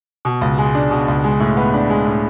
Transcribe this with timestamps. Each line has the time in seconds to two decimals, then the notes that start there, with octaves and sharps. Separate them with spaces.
0.25 B2
0.41 C#2
0.58 G#3
0.75 D4
0.91 B2
1.08 C#2
1.24 G#3
1.40 A2
1.57 B3
1.74 D4
1.90 G#3
2.07 A2